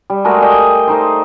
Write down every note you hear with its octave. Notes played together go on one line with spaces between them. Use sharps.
G3
G#3 A3 F#4 A#4
D5 D#5 G5
A3 D#4 C5
C5